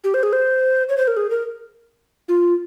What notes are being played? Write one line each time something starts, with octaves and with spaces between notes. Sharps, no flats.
G4
C5
G#4
C5
C#5
C5
A#4
G#4
A#4
F4